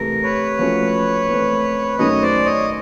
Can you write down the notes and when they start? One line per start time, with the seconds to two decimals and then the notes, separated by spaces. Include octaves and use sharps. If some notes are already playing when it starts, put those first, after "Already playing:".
Already playing: C3 E3 A3 A#4
0.23 B4 C#5
0.59 F3 A3 C#4 F#4
1.29 E3 A3 C4
1.99 F#2 D#3 F#3 A3 C#5 D#5
2.22 C5 D5
2.46 C#5 D#5